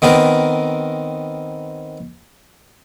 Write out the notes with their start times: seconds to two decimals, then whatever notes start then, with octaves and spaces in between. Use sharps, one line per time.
0.02 D#3 B3 C4 A#4